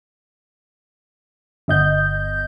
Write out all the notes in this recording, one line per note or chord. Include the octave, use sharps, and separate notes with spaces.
G1 D#5 G6